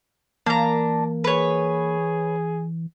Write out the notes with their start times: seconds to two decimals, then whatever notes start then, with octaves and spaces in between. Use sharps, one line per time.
0.46 E3 A#3 D4 A#5
1.24 G#4 B4 C#5